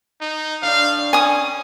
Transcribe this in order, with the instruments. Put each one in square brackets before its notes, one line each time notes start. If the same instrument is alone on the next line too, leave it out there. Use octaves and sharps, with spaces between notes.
[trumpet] D#4
[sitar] A2 D4 [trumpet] F5
[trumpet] C#4 [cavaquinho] G#5 D#6